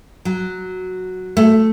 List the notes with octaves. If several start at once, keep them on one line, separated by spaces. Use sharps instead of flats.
F#3
A3